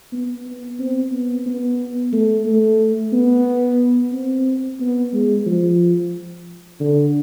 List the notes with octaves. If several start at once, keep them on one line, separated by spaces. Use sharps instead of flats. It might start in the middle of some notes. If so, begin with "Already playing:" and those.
B3
B3
C4
B3
B3
A3
A3
B3
C4
B3
G#3
F3
D3